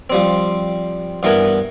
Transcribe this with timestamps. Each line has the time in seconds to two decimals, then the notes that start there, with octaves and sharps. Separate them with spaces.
0.10 F3 G3 C4
1.23 G2 E3 B3 A#4 G#5